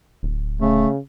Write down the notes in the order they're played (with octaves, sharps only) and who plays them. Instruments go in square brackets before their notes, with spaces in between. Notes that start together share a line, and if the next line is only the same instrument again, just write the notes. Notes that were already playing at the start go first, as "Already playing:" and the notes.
[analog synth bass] D1
[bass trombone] C#3 [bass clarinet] A3